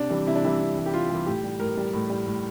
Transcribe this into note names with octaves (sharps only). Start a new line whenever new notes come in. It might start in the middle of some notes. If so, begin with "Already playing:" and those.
Already playing: C3 D4
E3 G3
C3 E4
D4
E3 G3 E4
C3
E3 G3
G4
C3 F4
E3 G3
A2 G4
G3
A2 A#4
G3
A2
G3
A2